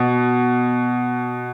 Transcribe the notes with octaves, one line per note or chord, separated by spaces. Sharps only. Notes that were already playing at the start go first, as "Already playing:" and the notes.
Already playing: B2